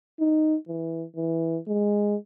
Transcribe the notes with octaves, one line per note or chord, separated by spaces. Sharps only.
D#4
E3
E3
G#3